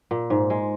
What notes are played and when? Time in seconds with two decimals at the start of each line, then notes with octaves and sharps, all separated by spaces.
0.11 A#2
0.30 G#2
0.50 G#3